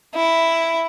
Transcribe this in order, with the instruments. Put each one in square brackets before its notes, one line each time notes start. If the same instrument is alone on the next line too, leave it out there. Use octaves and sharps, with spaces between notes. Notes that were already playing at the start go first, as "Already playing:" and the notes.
[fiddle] E4